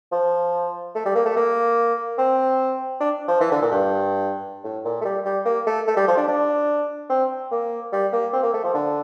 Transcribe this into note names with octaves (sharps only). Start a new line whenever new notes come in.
F3
A3
G3
A#3
A3
A#3
C4
D4
F3
E3
D3
A#2
G2
A2
A#2
A3
G3
G3
A#3
A3
A3
G3
F3
D4
D4
C4
A#3
G3
A#3
C4
A#3
A3
F3
D3